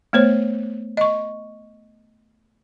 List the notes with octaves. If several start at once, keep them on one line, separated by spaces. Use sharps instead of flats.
A3 B3 C5 C#5
D#5 C#6